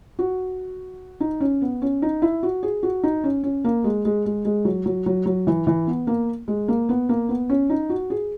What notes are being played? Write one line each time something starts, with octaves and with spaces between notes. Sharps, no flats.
F#4
D#4
C#4
B3
C#4
D#4
E4
F#4
G#4
F#4
D#4
C#4
C#4
A#3
G#3
G#3
G#3
G#3
F#3
F#3
F#3
F#3
E3
E3
B3
A#3
G#3
A#3
B3
A#3
B3
C#4
D#4
F#4
G#4